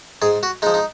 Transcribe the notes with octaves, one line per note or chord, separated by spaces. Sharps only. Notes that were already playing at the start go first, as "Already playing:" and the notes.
G#2 G#4
F#4
F3 G#3 D#4
D#4